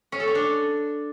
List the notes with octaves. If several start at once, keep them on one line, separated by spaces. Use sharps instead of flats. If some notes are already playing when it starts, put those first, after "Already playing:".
C#4
A4
C#4
D4